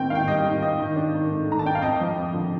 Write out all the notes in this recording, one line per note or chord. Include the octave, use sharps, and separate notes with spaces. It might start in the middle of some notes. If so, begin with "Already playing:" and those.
Already playing: D#3 A#3 C4 G5
D#3 F5 G5
G3 D#5
D#3
C4 D#5
D#3
D4
D#3
A3
D#3 A#5
A5
D4 G5
F5
F2 D#5
F3
F2
D3